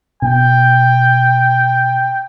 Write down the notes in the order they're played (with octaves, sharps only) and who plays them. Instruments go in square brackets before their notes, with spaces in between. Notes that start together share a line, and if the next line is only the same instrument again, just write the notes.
[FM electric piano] B2 [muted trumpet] G5